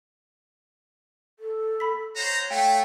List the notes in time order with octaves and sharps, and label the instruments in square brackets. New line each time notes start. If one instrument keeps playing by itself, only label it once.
[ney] A4
[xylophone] B5 B6
[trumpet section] F#4 C5 A#5 [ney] C#5
[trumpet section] A3 [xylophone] F5 G5